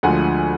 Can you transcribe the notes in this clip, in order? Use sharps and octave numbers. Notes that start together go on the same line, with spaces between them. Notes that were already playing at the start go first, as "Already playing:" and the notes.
D2 D3 F3 G#3 F#5 G#5